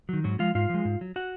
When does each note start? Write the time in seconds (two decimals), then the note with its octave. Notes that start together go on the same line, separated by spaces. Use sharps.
0.09 D#3 F#3
0.24 G#2 F#3 F#4
0.39 F3 G#3 F4 F5
0.55 G#2 F4 F5
0.69 F3 G#3
0.85 G#2
1.01 F#3
1.16 F#4 F#5